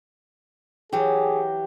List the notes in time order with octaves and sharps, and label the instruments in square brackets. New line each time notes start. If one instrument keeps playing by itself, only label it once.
[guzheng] E3 F#3 [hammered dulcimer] G4 [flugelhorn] G#4